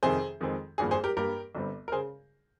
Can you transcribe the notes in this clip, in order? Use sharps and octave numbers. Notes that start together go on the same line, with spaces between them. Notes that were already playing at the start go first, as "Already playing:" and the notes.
F2 C3 D#3 G#4 C5
F2 D#3 G#3 C4
G#1 G2 F3 A#3 G#4
G#4 C5
G4 A#4
G2 G3 A#3 G4 A#4
G1 G2 G3 C4
A#4
C#3 G#4 C5